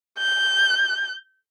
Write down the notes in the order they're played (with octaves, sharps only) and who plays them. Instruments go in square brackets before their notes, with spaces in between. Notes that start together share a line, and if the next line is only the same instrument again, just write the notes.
[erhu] G6